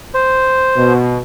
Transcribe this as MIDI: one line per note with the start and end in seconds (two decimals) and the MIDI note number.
0.14 0.93 72
0.76 1.19 47